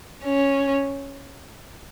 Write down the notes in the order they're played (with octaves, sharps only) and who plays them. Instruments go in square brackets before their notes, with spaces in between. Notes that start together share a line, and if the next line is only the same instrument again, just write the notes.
[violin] C#4